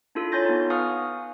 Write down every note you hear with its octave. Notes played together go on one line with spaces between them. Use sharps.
D4 E4 F4 A4
C#5 G#5 C6 G6 A6 A#6
B3 D#4
B4 F5 G#5 C#6 D#6 F6